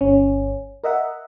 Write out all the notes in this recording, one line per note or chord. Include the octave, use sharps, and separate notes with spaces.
G1 C#4
A#4 D#5 E5 F#5